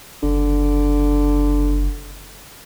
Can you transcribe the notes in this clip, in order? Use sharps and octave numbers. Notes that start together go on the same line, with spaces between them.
F#1 D3